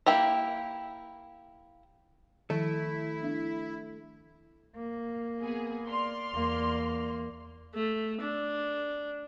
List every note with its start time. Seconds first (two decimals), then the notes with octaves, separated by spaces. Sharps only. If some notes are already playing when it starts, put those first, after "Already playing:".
0.06 A#3 E4 G4 A#5
2.50 D#3 F3 A3 E4
3.22 B3 D4 E5
4.76 A#3
5.42 B3 G#4 G#5
5.87 D5 C6 F6
6.33 E2 A#3
7.74 A3
8.21 D4